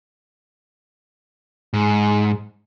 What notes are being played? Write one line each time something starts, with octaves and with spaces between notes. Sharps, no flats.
G#2